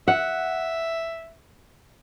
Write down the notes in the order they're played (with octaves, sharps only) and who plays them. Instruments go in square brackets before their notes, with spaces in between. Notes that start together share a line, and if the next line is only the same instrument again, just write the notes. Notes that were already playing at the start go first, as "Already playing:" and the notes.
[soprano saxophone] E5 [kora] F#5